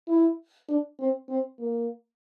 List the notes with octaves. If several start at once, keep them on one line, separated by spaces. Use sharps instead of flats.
E4
D4
C4
C4
A#3